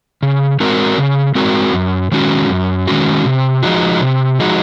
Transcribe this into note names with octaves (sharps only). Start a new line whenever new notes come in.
C#3
G#3 C4 F#4 A#4
C#3
G#3 C4 F#4 A#4
F#2
D#3 G#3 C#4 F#4
F#2
D#3 G#3 C#4 F#4
C3
F3 G#3 D#4 F#4
C3
F3 G#3 D#4 F#4